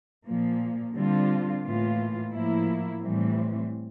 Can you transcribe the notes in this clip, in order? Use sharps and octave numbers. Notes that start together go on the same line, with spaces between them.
A#2 F3 A#3
D3 G3 C4 F4
A2 E3 A#3 F4
A2 F3 A#3 E4
A2 E3 G3 C4